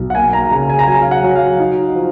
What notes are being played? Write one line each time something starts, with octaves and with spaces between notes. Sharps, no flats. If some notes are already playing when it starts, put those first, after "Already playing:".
Already playing: B1
F#5
A#3 G#5
A#5
C#3 A#5
G#5
A#5
F#3 G#5
F5
F#5
F#3
F5
D#4
F3